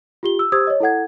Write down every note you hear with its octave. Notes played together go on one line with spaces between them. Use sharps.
F4 G4 G7
E6
G4 C5 D#6 E6 G#6
C#5 D#5
E4 A4 F#5 G#6